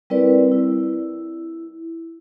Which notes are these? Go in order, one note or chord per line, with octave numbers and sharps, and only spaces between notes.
G3 C4 E4 A#4 B4 D5
E4